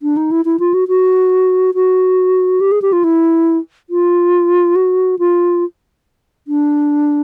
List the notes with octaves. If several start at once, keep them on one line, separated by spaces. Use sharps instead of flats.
D4
D#4
E4
E4
F4
F#4
F#4
F#4
G4
G#4
G4
F4
E4
F4
F#4
F4
D4